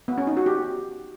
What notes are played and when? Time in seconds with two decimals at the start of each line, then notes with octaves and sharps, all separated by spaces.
0.08 B3
0.18 C#4
0.27 D#4
0.37 F#4
0.46 G4